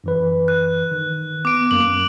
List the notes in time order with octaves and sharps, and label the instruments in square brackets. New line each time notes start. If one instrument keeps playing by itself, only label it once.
[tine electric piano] F#2 E3 B4
[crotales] F#6
[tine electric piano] D#3
[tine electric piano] B3 [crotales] D6 D7
[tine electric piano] F#2 A#3 [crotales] F#7